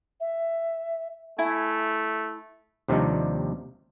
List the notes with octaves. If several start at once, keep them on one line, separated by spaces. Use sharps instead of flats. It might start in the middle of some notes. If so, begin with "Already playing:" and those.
E5
A3 E4 G#5
D#2 C3 F3 G3 D4 D#4